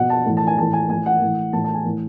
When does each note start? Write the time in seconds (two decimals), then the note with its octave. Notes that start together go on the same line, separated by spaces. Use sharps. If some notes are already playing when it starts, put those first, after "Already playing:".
Already playing: B2 F#5
0.10 A5
0.26 A2 E3
0.37 A5
0.47 G#5
0.58 A2 E3 A5
0.73 G#5
0.89 A2 E3 G#5
1.06 F#5
1.21 A2 E3
1.53 A2 E3 A5
1.64 A5
1.74 G#5
1.85 A2 E3